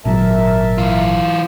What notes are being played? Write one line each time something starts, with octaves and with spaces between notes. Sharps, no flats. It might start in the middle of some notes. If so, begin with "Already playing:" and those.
G#1 A#2 F#3 A#4 E5 A5
E3 F4